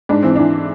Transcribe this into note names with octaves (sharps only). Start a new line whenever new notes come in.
G#2 D4
E3 C4
E3 D4